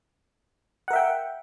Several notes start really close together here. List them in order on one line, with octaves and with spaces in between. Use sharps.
F#5 A#4 E5 G5